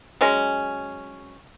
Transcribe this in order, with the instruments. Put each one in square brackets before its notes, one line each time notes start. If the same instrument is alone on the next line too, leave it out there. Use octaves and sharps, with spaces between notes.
[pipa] F#3 G#3 C#4